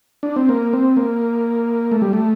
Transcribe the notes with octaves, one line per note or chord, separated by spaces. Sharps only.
D4
C4
A#3
C4
A#3
A3
G3
A3